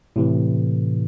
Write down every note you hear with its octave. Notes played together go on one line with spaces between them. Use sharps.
A2 C3 E3